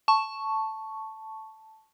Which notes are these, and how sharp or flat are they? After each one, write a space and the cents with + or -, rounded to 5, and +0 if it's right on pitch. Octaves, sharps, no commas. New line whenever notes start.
A5 +0 C#6 +0